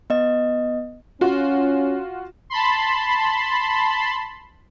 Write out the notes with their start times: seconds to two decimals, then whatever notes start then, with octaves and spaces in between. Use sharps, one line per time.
0.10 B3 D#5
1.21 C#4 F4 F#4
2.50 A5 B5 C6